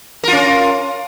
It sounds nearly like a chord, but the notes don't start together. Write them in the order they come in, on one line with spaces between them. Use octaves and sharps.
A#4 F4 C#4